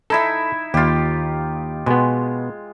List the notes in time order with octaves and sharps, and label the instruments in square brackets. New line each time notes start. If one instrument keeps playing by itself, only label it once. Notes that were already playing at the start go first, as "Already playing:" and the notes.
[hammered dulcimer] D#4 E4 E5 [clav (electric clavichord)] A4
[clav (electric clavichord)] D#2 [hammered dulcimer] F4 G4
[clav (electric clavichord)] B2 B3 [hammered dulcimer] G#3